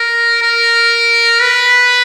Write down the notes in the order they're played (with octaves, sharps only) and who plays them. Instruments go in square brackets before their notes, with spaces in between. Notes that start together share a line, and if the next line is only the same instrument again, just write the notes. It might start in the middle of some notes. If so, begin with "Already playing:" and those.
Already playing: [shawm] A#4
A#4
B4